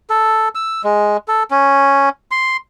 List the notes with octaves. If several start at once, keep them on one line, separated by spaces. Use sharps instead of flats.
A4
E6
G#3
A4
C#4
C6